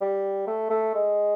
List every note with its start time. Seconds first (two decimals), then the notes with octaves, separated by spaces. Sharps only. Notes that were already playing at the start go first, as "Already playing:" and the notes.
0.01 G3
0.47 A3
0.70 A3
0.95 G#3